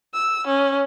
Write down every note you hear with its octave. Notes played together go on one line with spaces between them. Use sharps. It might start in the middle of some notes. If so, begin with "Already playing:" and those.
E6
C#4